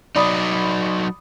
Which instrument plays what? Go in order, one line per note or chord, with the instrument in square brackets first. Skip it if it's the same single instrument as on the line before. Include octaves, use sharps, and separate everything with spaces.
[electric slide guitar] F#3 D#4 [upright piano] D5 B5 D#6